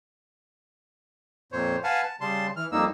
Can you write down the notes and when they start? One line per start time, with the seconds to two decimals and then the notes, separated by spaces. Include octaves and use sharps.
1.52 F2 A#2 C5 C#5
1.84 B4 F5 F#5 G#5 A5
2.03 A5
2.21 C#3 G3 A5 C6
2.56 E3 F6
2.72 F2 G3 A#3 D#4 E6